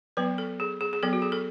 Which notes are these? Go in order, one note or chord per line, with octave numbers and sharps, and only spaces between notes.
F#3 B3 B4
A4
G#4
G#4
G#4
F#3 B3 A4
F#4
G#4
A4